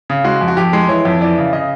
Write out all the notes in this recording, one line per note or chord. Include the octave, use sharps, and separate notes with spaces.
C#3
G#3 F#4
F2
F#4
F2 G4
G#3
E3 C#5
F2
E3 D5
C#3
C#3 D#5